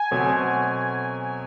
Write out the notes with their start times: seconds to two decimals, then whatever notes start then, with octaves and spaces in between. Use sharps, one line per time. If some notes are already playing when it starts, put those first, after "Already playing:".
Already playing: G#5
0.11 B2 F#3 A3 C4